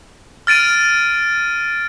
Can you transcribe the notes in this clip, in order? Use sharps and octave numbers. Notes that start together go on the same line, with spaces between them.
F6 A6 D7 D#7